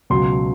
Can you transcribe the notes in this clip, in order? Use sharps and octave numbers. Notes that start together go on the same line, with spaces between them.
C#2 B2 F#3 C6